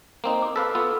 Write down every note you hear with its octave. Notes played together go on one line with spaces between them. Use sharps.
A#3 C4 D#4
D6
A4 B4 F5 E6 B6
B3 F4 A4